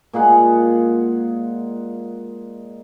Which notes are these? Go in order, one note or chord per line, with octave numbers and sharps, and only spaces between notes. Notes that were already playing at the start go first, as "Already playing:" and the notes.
A#2 G#3 G#4 F#5